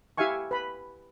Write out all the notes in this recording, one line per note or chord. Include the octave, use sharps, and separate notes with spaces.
E4 G4 E5 F5 G#5 C#6
B4 B5